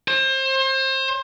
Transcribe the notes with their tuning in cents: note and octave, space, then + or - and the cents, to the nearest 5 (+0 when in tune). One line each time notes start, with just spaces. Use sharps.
C5 +30